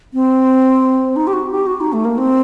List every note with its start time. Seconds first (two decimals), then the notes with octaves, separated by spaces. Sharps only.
0.14 C4
1.16 D#4
1.27 G4
1.33 F#4
1.51 G4
1.67 F#4
1.80 D#4
1.93 A3
2.05 A#3
2.18 C4